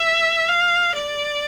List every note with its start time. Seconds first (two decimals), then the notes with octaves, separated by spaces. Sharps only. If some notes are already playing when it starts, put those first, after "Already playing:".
Already playing: E5
0.49 F5
0.94 D5